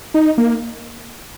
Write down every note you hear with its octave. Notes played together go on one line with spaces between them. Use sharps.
D#4
A#3